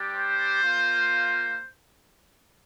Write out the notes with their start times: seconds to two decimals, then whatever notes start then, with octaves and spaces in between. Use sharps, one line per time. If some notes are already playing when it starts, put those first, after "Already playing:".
Already playing: G3 D4 G4
0.14 C5
0.62 A#3 F4